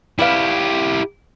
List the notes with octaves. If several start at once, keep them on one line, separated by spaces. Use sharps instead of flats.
G3 B3 E4 G4 F5